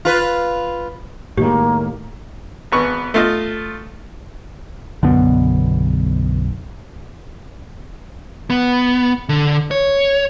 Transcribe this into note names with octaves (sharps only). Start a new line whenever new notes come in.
F4 B4
A2 D#3 G#3 A#3 G4
G#1 B3 C#6
A3 F4 D#5
B1 F#2 B2 D3 B3
B3
D3
C#5